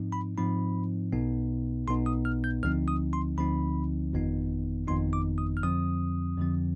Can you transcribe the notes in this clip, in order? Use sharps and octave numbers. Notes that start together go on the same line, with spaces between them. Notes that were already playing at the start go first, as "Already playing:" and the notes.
Already playing: G#2 F3 C4 D#4
B5
G#2 F3 C4 D#4 B5
B1 B2 B3 D#4
B1 B2 B3 D#4 C6
D#6
F6
G6
D2 D3 F3 C4 D#4 F6
D#6
C6
D2 D3 F3 C4 D#4 B5
G1 F2 D#3 B3 D#4
G1 F2 D#3 B3 D#4 C6
D6
D#6
F6
F2 D3 F3 C4 D#6
F2 D3 F3 C4